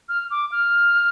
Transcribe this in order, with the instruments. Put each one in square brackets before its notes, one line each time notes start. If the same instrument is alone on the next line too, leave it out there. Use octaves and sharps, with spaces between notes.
[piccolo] F6
D6
F6